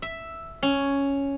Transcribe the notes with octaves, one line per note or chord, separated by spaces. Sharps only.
E5
C#4